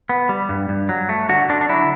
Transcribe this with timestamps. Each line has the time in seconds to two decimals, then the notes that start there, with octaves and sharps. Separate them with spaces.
0.09 B3
0.29 G3
0.49 G2
0.69 G2
0.89 F#3
1.09 A3
1.29 D3 F#4
1.49 D3 D4
1.61 D4
1.69 F#3 E4